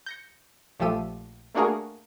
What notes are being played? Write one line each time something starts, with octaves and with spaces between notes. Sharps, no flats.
G6 A#6 C#7
A#1 F3 A3 G4 E6 D#7
A3 A#3 D4 F#4 G#4 A#4